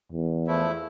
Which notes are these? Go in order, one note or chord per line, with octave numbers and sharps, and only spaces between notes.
E2
F3 A3 E4